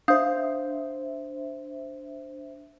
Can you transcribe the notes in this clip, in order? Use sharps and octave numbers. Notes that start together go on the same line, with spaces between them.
D4 C5 E5 F5 D#6 G6